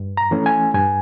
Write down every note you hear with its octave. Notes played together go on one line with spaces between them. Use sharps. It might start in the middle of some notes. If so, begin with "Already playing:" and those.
Already playing: G2
A#5
E3 A3 C#4
G#5
G2 G#5